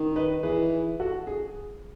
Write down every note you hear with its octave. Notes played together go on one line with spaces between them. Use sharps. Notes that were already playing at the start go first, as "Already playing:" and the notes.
Already playing: D#3
B4 D#5
E3 G#4 B4
F#4 A4
G#4